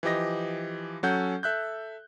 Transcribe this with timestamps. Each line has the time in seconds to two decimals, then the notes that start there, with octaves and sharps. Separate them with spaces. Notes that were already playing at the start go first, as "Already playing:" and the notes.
0.03 E3 F3 G4 D#5 A#6
1.03 F#3 C#4 A4 F#5 G6
1.43 A4 E5 F#6 G6